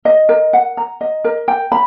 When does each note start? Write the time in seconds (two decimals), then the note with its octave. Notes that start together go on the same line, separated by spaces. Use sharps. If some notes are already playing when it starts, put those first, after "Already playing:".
0.05 D#5
0.29 A#4
0.53 F#5
0.77 A#5
1.01 D#5
1.24 A#4
1.48 G5
1.72 B5